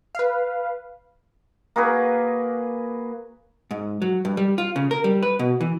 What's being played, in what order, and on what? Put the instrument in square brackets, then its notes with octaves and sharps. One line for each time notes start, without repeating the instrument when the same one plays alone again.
[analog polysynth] B4 F5
[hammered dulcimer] A#3 F#4 G#4 B4
[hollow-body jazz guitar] G#2
F#3
G2
G3
F4
C#3
A#4
G3
B4
B2
E3